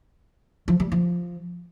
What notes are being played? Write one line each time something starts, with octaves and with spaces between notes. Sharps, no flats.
F3
G3
F3